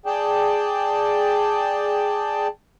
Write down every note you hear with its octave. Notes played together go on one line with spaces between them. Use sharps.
G#4 D5 G5 A5